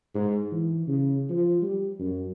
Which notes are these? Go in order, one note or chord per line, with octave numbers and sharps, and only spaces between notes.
G#2
E3
C#3
F3
G3
F#2